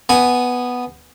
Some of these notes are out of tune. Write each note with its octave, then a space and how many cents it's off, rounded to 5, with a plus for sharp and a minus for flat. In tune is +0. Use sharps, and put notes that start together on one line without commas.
B3 +0 G#5 +0